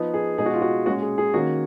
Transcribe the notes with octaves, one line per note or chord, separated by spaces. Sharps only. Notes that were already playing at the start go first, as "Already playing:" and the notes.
Already playing: F3 B3 D#4
G#4
B2 G#3 D#4 G#4
F#4
F4
F#4
A#2 G#3 C#4 F#4
G#4
G#4
D#3 A#3 C#4 F#4